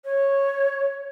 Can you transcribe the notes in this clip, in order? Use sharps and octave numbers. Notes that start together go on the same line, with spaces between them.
C#5